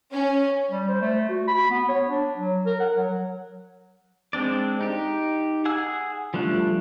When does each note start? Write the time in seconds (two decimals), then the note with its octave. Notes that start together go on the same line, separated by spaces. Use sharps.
0.12 C#4
0.71 G3
0.88 C5
1.01 A3
1.29 F#4
1.47 B5
1.70 B3
1.88 C#5
2.06 D4
2.37 F#3
2.66 A#4
2.79 F#5
2.96 F#3
4.33 G#3 C4 D4 D5
4.81 D#4 G4
5.65 G#4 F#5 G#5 E6
6.34 F3 G3 A3 D4